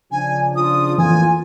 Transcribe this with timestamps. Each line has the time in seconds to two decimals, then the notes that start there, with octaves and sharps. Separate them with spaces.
0.12 C#3 F3 D4 G#5
0.56 F4 D#6
0.98 F2 A2 E3 A#3 G#5